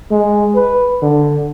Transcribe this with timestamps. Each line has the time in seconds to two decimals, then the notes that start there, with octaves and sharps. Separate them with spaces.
0.11 G#3
0.56 B4
1.02 D3